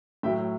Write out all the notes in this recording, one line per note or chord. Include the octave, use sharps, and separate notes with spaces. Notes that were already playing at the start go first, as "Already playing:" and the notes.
A2 F#3 E5 G5